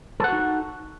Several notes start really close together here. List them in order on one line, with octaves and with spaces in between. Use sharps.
A4 F#5 F#4 D#4